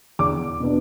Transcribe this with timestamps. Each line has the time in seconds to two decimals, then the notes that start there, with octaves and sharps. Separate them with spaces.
0.19 E2 D6
0.60 B2 B3 D4